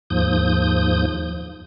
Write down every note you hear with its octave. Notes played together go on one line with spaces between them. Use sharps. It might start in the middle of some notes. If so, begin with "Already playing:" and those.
D#2 G#2 F3 D#6 G6